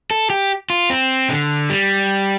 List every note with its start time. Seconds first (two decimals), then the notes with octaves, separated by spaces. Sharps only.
0.11 A4
0.30 G4
0.70 F4
0.90 C4
1.30 D3
1.70 G3